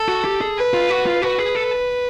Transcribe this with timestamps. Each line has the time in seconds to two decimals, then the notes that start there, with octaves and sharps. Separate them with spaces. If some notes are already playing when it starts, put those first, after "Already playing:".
Already playing: A4
0.08 F#4
0.25 G4
0.41 G#4
0.57 B4
0.74 F4
0.90 F#4
1.06 F4
1.22 F#4 B4
1.38 G#4
1.55 A4